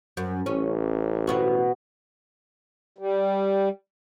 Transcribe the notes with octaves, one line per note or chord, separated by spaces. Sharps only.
F#2
A1 C#4
B2 B3 F#4
G3